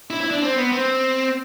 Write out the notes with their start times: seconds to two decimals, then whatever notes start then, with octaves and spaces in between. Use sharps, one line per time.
0.10 E4
0.21 E4
0.31 D4
0.42 C4
0.57 B3
0.72 C4